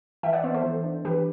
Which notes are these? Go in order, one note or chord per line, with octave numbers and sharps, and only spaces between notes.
E3 E5 G5
D5 F#5
B3 C5 E5
A4 C5
E3
D4
E3 G4 B4